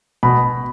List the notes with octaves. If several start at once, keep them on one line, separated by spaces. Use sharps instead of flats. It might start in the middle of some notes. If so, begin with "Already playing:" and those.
B2 B5